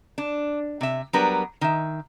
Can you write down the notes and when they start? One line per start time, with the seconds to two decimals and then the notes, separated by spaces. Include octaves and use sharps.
0.18 D4
0.81 C3 E5
1.13 F#3 G3 B3 D4 A#4 B4
1.61 D#3 E5